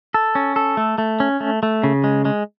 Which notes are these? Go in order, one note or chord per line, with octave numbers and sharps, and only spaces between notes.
A4
C#4
A4
A3
A3
C#4
A3
A3
C#3
G#3
G#3